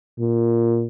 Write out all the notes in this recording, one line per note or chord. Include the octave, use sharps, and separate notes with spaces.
A#2